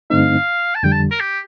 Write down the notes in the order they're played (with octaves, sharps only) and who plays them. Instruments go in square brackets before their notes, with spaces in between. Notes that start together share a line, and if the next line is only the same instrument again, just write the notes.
[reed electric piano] G2 D3 A3 C4 D#4 [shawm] F5
[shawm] A5
[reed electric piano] F2 D3 G3 [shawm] G5
[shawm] A5
A#4
G4